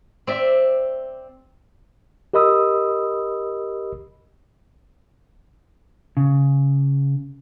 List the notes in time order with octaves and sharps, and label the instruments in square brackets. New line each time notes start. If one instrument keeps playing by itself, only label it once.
[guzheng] C4 D5 E5
[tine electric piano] G4 A#4 D#5 B5 D#6 E6
[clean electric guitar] C#3